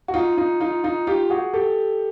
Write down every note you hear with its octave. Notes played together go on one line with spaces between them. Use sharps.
F#4
D#4 F4
D#4 F4
D#4 F4
D#4 F4
F4 G4
F#4 G#4
G4 A4